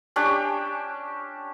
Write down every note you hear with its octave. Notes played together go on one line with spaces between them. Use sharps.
C#4 D4 G4